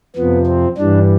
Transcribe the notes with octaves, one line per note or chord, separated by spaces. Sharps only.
F2 C3 F3 B3
C4
G2 E3 G3 D4